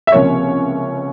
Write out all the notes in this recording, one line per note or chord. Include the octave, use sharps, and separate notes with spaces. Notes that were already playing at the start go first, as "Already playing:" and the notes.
E5
C#2 C3 F3 A#3 C#5